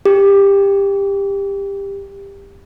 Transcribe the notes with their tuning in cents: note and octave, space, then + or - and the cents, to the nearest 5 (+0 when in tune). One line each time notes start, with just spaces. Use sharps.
G4 +20